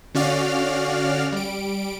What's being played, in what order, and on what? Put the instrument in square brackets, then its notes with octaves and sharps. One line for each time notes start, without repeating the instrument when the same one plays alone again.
[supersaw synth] D3 C#4 F#4 D5 F5 F6
G3 D7